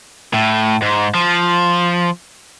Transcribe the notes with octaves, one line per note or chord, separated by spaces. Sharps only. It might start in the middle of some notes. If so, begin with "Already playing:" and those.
A2
G#2
F3